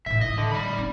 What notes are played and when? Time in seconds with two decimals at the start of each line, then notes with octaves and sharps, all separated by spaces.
0.06 A2 E3 E5
0.21 D#4 D#5
0.38 D3
0.52 D5 B5
0.78 C4 D#4